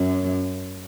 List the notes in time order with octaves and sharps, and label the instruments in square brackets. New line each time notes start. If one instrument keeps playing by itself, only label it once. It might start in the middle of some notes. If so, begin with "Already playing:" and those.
Already playing: [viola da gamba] F#2